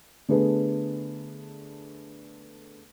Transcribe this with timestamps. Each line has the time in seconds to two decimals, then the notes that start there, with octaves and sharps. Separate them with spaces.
0.28 D3 A3 B3 D4 G#4 B4